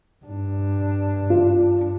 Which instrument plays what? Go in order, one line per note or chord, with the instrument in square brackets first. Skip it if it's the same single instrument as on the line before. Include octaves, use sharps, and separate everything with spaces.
[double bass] G2 D4
[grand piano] F4